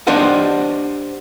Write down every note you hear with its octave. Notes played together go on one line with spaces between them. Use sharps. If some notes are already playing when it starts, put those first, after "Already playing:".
D4 G4 C5 D5 D#5 F#5